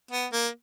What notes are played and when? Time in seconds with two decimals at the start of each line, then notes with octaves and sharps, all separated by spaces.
0.11 B3
0.32 A#3